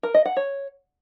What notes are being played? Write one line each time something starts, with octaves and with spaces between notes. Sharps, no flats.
A#4
D#5
F#5
C#5